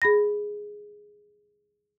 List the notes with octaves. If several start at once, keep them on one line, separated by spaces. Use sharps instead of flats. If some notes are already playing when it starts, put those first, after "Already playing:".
G#4 B5 A#6